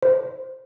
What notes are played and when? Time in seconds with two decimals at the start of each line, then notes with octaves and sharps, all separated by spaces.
0.03 C5